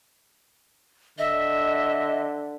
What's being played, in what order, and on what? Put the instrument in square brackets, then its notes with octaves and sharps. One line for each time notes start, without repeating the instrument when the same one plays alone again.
[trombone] D3 [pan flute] D#5 [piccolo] E5